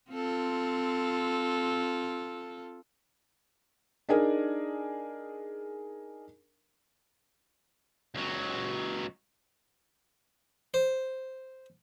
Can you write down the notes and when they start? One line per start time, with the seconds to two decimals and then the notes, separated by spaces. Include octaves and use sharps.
0.11 C4 F4 A4
4.09 D4 D#4 G#4 A#4
8.15 C#2 F#3
10.74 C5